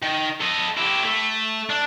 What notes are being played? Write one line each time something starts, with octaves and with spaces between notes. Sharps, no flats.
D#3
A4 D#5
E4 G4
A3
D4